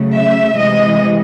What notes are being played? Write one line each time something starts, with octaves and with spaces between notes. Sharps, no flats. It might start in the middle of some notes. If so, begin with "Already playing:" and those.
Already playing: C#3 F#3 A3
E5
C3 E3 G#3 D#5